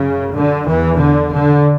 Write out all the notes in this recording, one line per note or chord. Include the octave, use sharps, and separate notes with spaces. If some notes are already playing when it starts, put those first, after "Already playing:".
Already playing: F#2 C#3
D3
E2 E3
D3
D3